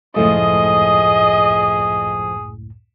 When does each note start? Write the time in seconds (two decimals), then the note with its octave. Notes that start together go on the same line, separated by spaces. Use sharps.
0.16 C#2 F#2 A2 F3 A3 G#4 D#5